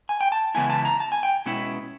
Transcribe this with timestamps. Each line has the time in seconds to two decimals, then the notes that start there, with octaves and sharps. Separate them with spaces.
0.09 G#5
0.21 G5
0.32 A5
0.55 C#3 E3 G#3 B3 E4 G#5
0.70 A5
0.85 A#5
1.00 A5
1.12 G#5
1.23 G5
1.46 B2 G#3 C#4 E4